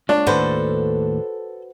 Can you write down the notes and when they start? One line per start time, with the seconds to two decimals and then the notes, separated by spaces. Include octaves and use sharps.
0.09 G#3 D4 F4 C#5
0.27 D#2 A2 C3 F#4 A4 B4 C5